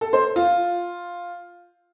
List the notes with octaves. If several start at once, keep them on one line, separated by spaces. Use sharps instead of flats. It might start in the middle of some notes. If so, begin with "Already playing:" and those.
A4
C5
F4